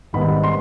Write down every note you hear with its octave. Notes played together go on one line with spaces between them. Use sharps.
G#1 G#2 D#3 G3 B3 B5
C6